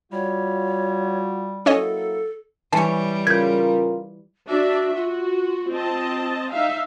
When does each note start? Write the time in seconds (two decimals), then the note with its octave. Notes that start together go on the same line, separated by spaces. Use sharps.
0.12 G3 F4 F#4 C#5
1.66 F#3 A#3 C#4 E4 A4 C#5 D#5
2.73 E3 G3 C#5 A5
3.27 C#3 F4 A#4 B4 G6 G#6
4.48 D4 F#4 E5
4.95 F4 F#4
5.71 C4 D#5 A5
6.52 D#4 E5 F5